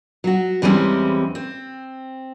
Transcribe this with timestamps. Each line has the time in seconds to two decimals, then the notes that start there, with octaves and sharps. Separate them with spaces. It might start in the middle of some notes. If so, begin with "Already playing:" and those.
0.24 F#3 F#4
0.62 E2 E3 G3 G#3 C4 C#4
1.35 C4